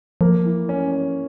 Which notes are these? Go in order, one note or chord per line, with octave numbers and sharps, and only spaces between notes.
F3 A#3
E3
C#4
C#4